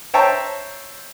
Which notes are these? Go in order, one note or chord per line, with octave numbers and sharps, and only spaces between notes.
C5 C#5 E5 G5 A5 A#5